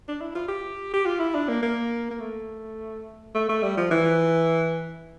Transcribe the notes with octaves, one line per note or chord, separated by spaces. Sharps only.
D4
E4
F4
G4
G4
F4
E4
D4
A#3
A#3
A#3
A3
A3
A3
G3
F3
E3